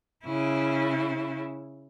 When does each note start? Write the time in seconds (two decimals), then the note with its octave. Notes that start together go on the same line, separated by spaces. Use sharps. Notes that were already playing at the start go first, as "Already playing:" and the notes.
0.25 C#3 E4